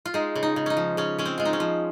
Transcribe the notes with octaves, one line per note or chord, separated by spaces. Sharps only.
F4
G#3 D#4
C#3
D#4
C#3
C#4 D#4
F3
C#3 C#4
G#3 C#4
C4
G#3 F4
D#4
C#4
F3